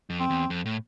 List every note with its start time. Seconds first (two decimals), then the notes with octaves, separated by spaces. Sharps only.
0.10 F2
0.20 C4
0.30 E2
0.50 F2
0.66 A2